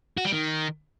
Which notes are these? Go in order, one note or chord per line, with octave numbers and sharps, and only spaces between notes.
F#4
G3
D#3